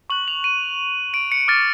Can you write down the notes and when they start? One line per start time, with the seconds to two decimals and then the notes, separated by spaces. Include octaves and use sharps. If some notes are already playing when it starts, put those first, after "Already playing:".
0.10 C#6 F#6 F#7
0.28 F7
0.44 D#7
1.14 D7
1.32 C#7
1.48 D6 F6 A6